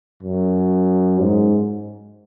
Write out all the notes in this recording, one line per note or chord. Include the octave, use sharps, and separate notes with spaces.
F#2
G#2